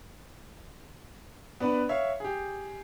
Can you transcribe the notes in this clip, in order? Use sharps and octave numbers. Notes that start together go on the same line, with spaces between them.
B3 D4 B4
C#5 E5 F5
G4 G#4